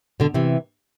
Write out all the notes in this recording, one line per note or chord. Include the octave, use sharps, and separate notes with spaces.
B2 D3
C3 E3